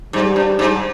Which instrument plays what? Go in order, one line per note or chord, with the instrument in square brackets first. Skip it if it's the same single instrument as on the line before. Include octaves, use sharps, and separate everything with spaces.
[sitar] G#2 [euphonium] G3
[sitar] G2
G#2